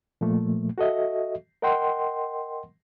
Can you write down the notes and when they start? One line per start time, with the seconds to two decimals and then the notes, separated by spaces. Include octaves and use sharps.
0.21 A#2 F3 A3 A#3
0.78 F#4 A4 D#5 E5
1.62 A#4 D#5 F#5 G5 C6